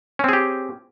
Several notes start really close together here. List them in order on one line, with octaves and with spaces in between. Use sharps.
C#4 C4 G#4 G4